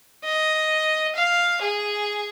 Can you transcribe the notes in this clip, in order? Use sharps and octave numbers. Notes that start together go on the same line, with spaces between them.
D#5
F5
G#4